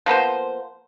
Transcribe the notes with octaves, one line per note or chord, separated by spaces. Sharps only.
F3 A#3 B3 C5